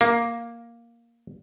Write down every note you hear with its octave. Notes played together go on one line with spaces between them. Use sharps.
A#3